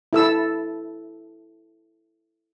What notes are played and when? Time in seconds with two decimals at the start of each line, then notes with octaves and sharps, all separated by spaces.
0.13 E4 A4 E6